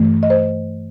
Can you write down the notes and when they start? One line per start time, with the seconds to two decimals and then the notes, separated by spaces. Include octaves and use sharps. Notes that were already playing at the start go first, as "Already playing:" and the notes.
Already playing: G2 E3 A3
0.23 D#5
0.30 C5